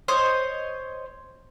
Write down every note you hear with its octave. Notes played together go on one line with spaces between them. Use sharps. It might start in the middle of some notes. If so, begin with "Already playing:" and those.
C5 C#5 D#5